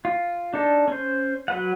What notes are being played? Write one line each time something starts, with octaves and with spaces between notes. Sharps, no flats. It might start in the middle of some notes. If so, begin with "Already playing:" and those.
F4
D4 D#4 A4
C#4 C5
F#3 B4 F#5